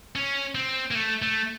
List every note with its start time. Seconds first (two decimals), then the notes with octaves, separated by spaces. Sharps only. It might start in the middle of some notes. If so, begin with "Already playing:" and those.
0.16 C#4
0.55 C4
0.91 A#3
0.95 A3
1.22 A3